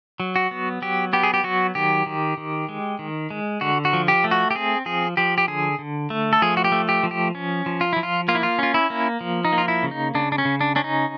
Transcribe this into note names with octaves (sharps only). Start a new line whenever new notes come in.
F#3
F#4
B3
F#3 G4
B3 G4
G#4
G4
F#3 F#4
D#3 G4
D#3
D#3
G#3
D#3
G#3
D3 F#4
F#4
F3
G4
A3
F#4
G4
C4 G#4
F3 G#4
F3 G4
G4
D3 G#4
D3
A3
A4
F3 G#4
F#4
G4
A3
G4
F3
G4
C#4
F3
F4
F3 E4
F4
A#3 F4
E4
F4
C#4 F4
E4
A#3
F3
D#4
A#3
F4
E4
C#3
D#4
C#3 D4
D4
C#4
C#3
D4
C#4 D4
D#4